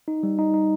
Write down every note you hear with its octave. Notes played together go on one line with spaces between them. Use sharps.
D#4
G3
D#4
D#4